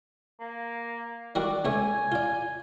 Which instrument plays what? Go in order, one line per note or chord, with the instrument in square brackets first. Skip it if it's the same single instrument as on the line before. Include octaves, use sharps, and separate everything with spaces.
[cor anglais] A#3
[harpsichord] D#3 G3 F#4 [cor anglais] D5
[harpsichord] C#2 A3 C#5 [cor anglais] G#5
[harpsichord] F4 D5